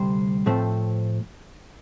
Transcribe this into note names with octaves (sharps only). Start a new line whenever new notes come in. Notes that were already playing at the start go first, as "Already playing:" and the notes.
Already playing: D2 C3 G3 C5
A2 F3 A3 C4